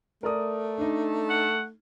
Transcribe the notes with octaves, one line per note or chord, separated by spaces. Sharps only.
A3 A#4 D5 D#6
D4 D#4
F#5